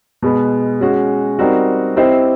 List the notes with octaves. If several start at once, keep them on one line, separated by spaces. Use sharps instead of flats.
B2 G#3 B3
G#3 C#4 F#4
G3 C4 D#4 F#4 A#4
C4 E4 G4 C5 D#5